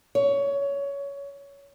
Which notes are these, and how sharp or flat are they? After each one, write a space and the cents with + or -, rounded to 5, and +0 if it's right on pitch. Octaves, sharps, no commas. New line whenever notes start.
C#5 +15